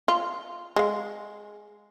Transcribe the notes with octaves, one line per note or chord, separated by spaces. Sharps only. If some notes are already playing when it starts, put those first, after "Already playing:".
F4
G#3 F5